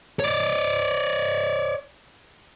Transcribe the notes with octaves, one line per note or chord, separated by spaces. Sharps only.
C#5 D5